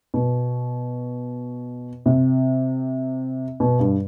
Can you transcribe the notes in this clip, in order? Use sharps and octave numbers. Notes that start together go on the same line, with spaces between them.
B2
C3
B2
G2